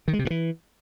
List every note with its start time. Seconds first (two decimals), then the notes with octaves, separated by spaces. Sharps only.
0.08 D#3
0.13 G#3
0.19 C3
0.25 G2
0.30 E3